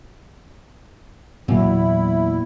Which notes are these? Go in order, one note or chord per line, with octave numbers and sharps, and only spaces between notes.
E2 A#2 F#3 A#3 E4